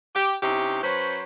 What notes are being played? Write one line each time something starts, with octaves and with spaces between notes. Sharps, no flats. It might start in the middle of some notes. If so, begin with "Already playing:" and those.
G4
C3 C#4 D#4 E4 G4
F#3 C#4 B4 C5